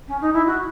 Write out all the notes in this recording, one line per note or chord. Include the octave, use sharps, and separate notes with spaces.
C#4
D#4
E4
F#4